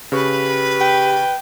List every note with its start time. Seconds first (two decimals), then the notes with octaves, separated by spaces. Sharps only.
0.12 C#3 G4 B4 C#6
0.81 G5